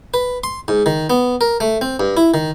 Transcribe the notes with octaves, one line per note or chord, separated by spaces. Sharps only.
B4
C6
G#2
D#3
B3
A#4
A3
C4
G2
E4
D#3